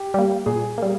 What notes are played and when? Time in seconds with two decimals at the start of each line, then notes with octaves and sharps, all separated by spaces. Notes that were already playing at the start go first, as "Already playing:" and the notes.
Already playing: G4
0.14 G3 A#3
0.46 A#2 G#4
0.78 G3 A#3